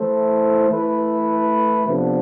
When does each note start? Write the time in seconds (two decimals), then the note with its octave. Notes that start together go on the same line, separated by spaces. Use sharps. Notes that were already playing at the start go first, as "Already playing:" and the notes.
Already playing: E3 A3 E4 A4 C5
0.69 E3 A3 E4 B4
1.86 C3 F3 B3 D4 A4